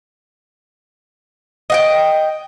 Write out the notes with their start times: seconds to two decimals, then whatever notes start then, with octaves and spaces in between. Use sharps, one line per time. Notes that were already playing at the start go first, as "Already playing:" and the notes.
1.70 D#5 F#5 G5